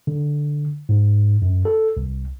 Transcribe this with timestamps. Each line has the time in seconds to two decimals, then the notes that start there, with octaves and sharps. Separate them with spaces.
0.07 D3
0.89 G#2
1.42 F#2
1.65 A4
1.97 C2